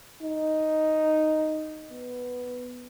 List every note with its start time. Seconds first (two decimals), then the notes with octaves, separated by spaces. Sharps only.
0.23 D#4
1.90 B3